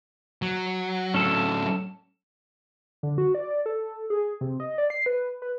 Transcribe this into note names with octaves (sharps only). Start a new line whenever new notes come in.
F#3
A2 F#3 C#4 A4
D3
F#4
D5
D5
A4
G#4
C3
D#5
D5
C7
B4
B4